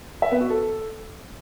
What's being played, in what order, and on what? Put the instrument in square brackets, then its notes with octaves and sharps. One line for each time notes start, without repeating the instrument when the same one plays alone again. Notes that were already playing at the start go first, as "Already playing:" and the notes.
[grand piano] E5
B3
F#4
A4